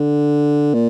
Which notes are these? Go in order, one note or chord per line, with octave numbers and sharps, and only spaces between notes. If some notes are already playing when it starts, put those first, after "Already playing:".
Already playing: D3
A#2